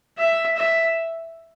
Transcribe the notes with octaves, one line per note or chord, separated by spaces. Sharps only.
E5
E5